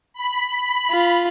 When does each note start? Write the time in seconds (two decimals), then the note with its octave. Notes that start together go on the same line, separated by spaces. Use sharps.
0.14 B5
0.91 F4